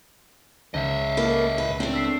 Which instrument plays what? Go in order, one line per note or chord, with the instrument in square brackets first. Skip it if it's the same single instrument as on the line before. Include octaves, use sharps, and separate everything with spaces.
[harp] C#2 [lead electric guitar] D#5 E5
[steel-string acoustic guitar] A#3 A4 B4
B4
[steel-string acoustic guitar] A3 D4 [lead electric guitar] C4
[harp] E6 B6 C7